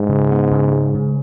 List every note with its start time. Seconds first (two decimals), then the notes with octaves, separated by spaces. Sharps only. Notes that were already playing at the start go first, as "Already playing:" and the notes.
Already playing: G#2 G#3
0.09 C#3
0.31 B3
0.52 C#3
0.72 G#3
0.94 C#3